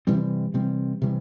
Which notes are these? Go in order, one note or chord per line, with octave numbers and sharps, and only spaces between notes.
C3 E3 G3 C4
C3 E3 G3 C4
C3 E3 G3